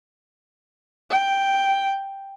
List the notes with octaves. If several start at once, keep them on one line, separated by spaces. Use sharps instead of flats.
G5